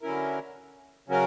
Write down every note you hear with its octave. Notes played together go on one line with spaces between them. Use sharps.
D3 F#3 C#4 E4 A#4
C#3 F#3 C#4 F#4 A#4